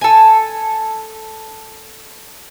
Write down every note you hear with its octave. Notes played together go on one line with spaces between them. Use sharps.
A4 G#5